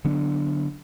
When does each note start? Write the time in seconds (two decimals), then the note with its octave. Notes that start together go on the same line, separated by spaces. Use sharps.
0.05 D3 F#3 B3 D4